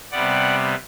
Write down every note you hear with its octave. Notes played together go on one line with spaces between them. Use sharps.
C3 G3 B3 D5 F#5